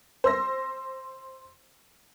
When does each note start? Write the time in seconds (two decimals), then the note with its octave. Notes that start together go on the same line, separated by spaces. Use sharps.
0.24 C5 E6 A#6